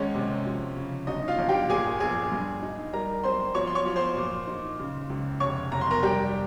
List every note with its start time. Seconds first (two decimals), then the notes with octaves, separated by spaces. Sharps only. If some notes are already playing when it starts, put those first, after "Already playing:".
Already playing: G#1 G#3 C#4 C#5
0.15 C3
0.46 F3
0.76 C#3
1.07 G1 D#4 D#5
1.28 F4 F5
1.39 G1
1.49 G4 G5
1.69 A#2 G#4 G#5
2.00 A#1 G#4 G#5
2.31 G2
2.62 D#4
2.93 G3 A#4 A#5
3.24 C4 C5 C6
3.55 F3 C#5 C#6
3.67 C6
3.75 C#5 C#6
3.86 F3
3.96 C5 C6
4.17 A#2
4.47 D#4
4.80 C#3
5.10 C#2
5.40 F1 C#5 C#6
5.72 F1 A#5
5.81 C6
5.91 A#4 A#5
6.03 G3 G4 G5